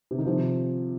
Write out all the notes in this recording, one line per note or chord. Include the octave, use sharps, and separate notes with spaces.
C3
D#3
C3 F3